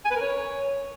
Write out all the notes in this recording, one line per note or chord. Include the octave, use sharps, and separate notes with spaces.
G#5
B4
A#4
C#5